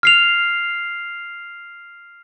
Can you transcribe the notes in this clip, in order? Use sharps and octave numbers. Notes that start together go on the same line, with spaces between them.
F6 C7 F7